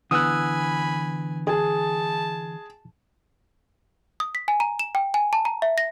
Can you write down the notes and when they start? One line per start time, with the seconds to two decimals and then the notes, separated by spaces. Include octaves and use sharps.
0.11 D3 E3 B3 G#5 B5 D#6 E6 F#6
1.47 G#4 A5
4.20 D#6
4.35 B6
4.48 G#5
4.60 A#5
4.79 E7
4.95 G5
5.14 G#5
5.33 A5
5.45 A#5
5.62 E5
5.78 A#6